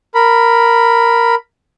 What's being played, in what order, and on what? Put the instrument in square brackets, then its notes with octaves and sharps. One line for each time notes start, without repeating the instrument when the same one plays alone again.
[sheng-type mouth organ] A#4 B5